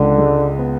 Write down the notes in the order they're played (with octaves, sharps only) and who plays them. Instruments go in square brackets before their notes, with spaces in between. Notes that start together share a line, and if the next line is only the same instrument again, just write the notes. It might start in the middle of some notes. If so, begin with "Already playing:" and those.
Already playing: [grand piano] C#2 [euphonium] D3
[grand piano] G#3
B3